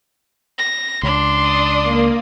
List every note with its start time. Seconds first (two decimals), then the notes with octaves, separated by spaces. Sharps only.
0.58 A#6
1.03 C#2 D4 C6
1.39 D5 D#6
1.83 A#3